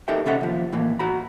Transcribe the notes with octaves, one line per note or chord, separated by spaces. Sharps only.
D#4 G4 A4 A#4 E5 G5
D2 C3 C#4 A4 E5 F#5
D#2 F3
A2 E3 A#3
F#4 A#5 B5